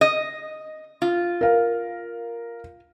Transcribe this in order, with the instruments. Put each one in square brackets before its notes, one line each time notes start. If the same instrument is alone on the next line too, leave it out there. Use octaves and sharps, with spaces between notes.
[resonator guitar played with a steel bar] D#5
F4
[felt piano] A#4 F5